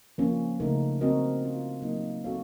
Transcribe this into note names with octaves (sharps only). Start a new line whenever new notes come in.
F3 A#3 C#4
C#3 A3 D#4 A#4
C4 F#4 A#4 D#5
A3 C#4 F4
F#3 A#3 D#4 A#4 D#5
C4 F#4 A4 C#5 F5